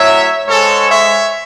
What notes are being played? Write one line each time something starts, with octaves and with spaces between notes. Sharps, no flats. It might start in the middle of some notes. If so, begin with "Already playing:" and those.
Already playing: A2 F#3 C#5 E5
G#2 G#3 A4 C#5
C#5 E5